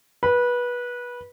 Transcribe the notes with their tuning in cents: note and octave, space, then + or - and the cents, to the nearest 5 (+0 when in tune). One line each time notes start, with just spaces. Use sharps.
B4 -20